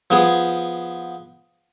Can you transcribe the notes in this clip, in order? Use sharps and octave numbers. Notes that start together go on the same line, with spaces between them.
F3 B3 G#4